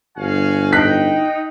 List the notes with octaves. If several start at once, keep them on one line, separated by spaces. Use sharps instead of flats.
G1 F#4 F5 G#5
D#4 G5 F#6 B6